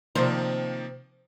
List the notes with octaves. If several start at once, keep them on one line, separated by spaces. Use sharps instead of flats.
C3 D#3 F3 A#3 C5